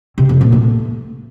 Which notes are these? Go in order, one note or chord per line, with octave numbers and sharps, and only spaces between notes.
C3
F2
A#2
A3